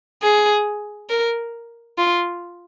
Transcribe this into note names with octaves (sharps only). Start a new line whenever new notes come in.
G#4
A#4
F4